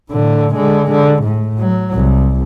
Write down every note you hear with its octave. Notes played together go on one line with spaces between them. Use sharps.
A2 D3
D3 G#3
D3
A2
F#3
C2